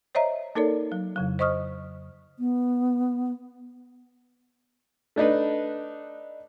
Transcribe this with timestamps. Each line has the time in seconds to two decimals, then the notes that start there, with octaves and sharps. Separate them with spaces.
0.15 C5 C#5 D#5 E5 A#5
0.55 A#3 D#4 A4 A#4 C#5 D5
0.92 F#3
1.16 F2 C#3 F#3
1.39 C5 D#5 C#6 D#6 F6
2.39 B3
5.16 A3 D4 D#4 B4